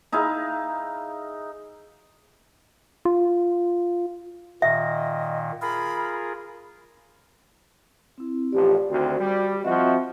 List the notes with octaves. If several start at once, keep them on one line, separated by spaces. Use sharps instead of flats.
D#4 E4 G#4 F5
F4
A#2 D#3 D#5 E5
F4 G#4 A#4 B5
C4 E4
A1 F2 G4 D5
D2 D#3 C4 F#4
G3
F3 C4 F#4 D#5 E5